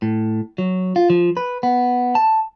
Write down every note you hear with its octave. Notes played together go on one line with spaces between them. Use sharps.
A2
F#3
F4
F3
B4
B3
A5